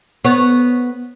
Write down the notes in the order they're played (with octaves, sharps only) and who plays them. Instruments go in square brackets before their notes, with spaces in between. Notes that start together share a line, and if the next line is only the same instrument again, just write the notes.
[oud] B3 C#5